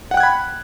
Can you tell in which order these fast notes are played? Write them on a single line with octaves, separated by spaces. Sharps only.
F#5 G5 F#6 G#6 B5